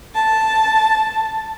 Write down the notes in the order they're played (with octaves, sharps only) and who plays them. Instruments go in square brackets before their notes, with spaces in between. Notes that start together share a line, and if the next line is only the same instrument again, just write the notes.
[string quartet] A5